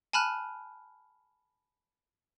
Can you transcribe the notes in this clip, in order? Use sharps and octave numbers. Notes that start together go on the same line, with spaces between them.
G#5 A5 B5 F6 F#6